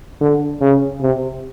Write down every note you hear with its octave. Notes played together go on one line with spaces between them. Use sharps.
D3
C#3
C3